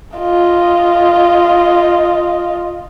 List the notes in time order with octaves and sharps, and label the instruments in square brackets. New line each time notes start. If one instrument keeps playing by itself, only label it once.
[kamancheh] F4 D#5